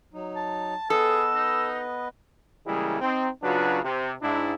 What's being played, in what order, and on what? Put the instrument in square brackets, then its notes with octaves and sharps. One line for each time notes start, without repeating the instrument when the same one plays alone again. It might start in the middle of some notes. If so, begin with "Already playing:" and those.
[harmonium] F#3 D#4
[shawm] A5
[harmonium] B3 B4 D#5 [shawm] G#4 [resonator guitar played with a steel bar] A4 [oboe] E6
[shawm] D#4
[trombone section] C#3 E3 G3 G#3 A#3 E4
C4 D#4
C#3 F#3 D4 F4 F#4 B4
C3
G#2 D4 E4